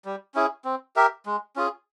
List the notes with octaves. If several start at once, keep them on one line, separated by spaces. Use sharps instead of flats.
G3
C#4 E4 G#4
C4
G4 A#4 E5
G#3
C#4 F4 G#4